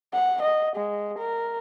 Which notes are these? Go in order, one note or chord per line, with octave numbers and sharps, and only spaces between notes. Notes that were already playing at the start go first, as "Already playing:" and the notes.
F#5
D#5
G#3
A#4